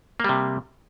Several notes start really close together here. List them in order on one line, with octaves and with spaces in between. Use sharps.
A#3 G3 C3